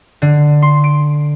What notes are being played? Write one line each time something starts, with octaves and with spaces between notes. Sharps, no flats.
D3
C6
D7